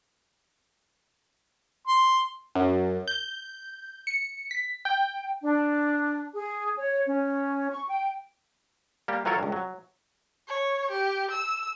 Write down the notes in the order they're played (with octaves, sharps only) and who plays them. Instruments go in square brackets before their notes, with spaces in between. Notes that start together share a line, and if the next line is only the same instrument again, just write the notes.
[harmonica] C6
[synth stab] F#2
G6
C#7
B6
G5
[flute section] D4
G#4
C#5
C#4
C#6
G5
[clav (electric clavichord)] G3 A#3 G4
E3 F#3 F4 A4 A#4 C#5
C#2 G2
F#3
[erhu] C#5
G4
E6